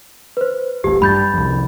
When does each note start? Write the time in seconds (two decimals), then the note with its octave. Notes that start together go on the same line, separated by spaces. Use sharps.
0.37 B4 C5
0.84 D#1 A1 A2 G4
1.02 G2 B5 G6 A6
1.34 C2 F2